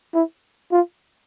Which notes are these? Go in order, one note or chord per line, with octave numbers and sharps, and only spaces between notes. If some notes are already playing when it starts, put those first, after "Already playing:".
E4
F4